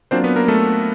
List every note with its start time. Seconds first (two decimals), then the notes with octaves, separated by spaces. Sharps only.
0.11 F#3 A#3 C4 D4 F4 C5
0.24 B3 B4
0.36 A#3 A#4
0.48 A3 A4